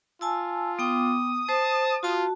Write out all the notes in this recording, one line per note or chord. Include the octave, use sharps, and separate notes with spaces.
F4 G#5 A5 E6
B3 G5 D6 D#6
C5 A5
F4 F#4 A5